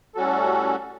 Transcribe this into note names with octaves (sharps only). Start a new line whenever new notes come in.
A2 G3 C#4 F#4 A4